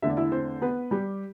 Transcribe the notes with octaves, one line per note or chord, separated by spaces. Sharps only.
E2 D3 A3 E5
D5
E4 E5
C4 C5
B3 B4
G3 G4